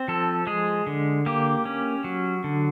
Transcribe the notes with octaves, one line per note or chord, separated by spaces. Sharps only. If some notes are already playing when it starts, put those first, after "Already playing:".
Already playing: C4
F3 A4
G#3 G#4
D3
A#3 G4
C#4
F#3
D3